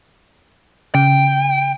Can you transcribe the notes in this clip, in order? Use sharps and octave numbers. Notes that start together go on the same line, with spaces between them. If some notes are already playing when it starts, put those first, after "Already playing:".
C#3 G5